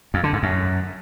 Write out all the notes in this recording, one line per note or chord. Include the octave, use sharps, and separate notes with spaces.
F2
D3
G#2
F#2